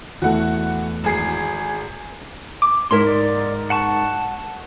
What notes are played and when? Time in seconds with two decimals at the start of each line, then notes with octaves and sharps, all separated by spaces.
0.22 E2 A3 F#4 F#5
1.04 G#1 G#4 C7
2.62 D6
2.91 G#2 E4 A#4 C#5 C6
3.07 D5
3.70 F#5 A5 C#6